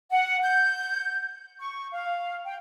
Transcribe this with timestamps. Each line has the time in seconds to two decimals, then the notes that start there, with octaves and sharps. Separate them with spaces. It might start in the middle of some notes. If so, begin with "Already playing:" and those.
0.10 F#5
0.43 G6
1.60 C#6
1.92 F5
2.45 G5